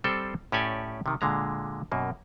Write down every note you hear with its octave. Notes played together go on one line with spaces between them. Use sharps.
G3 C4 A4 C5 G5
A2 C#4 G4 A4 D5 G#5
C3 D#3
A#2 D3 G#3 A#5
F#2 B2 A#3